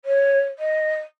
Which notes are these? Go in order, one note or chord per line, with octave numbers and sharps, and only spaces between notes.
C#5
D#5